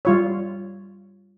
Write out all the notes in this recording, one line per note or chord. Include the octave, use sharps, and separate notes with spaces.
G3 F4 C#5